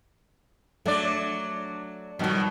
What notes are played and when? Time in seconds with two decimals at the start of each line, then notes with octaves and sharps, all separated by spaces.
0.86 F#3 A3 D4 D5
2.19 F2 B2 D#3 F#3 G3